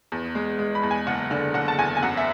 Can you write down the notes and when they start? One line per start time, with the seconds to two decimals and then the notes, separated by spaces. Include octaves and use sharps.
0.12 E2
0.35 G#3
0.59 G#3
0.75 B5
0.83 E2
0.91 G#5
1.07 F#1 F#5
1.31 D3
1.54 F#1 F#5
1.68 A5
1.79 E2 G#5
1.97 G#5
2.02 F#2 F#5
2.17 E5